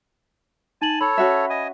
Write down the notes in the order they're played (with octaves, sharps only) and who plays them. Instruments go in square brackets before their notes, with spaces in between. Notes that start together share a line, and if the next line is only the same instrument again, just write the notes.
[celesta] D#4 F#7 [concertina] G#5 A5
[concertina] A4 C#5 [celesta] B5
[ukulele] C#4 F#4 E5
[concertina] D#5 G#5